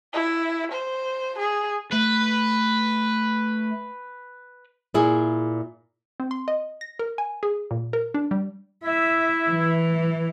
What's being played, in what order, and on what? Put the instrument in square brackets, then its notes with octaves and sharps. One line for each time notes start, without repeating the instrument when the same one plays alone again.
[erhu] E4
C5
G#4
[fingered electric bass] A3 [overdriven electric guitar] B4
[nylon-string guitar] A#2 E4 G#4
[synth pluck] C4
C6
D#5
A#6
A#4
G#5
G#4
A#2
A#4
D4
G3
[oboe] E4 [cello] E5
[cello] E3